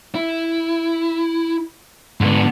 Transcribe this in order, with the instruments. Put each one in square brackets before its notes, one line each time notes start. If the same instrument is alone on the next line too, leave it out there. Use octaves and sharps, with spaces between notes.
[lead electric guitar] E4
[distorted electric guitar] G#2 B3 [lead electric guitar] D3